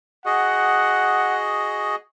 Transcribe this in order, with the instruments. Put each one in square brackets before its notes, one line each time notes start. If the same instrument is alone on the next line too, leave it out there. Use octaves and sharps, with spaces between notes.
[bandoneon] F#4 G#4 D#5 [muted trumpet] F#5